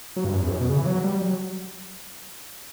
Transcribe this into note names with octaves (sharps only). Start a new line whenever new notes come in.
F#3
G2
F#2
E2
F#2
B2
C#3
E3
F#3
G3
F#3